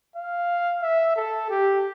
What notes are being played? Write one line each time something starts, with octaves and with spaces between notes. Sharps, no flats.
F5
E5
A4
G4